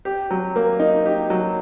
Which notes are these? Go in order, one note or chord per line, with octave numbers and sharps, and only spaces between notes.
G4
F#3
A#3
D#4
G4
F#3